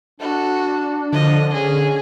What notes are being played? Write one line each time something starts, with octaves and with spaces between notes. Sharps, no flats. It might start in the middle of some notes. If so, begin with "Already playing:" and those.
D4 F#4 A4
D3 F3 D#5
C#4 G#4